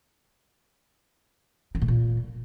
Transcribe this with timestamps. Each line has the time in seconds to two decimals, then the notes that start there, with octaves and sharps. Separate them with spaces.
1.75 D#3
1.82 A2
1.88 A#2